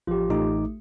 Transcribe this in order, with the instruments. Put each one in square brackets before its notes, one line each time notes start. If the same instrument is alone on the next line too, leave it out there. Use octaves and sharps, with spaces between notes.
[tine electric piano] A1 F3 [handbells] F4 G4
[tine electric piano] A1 D#4 D6 [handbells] A3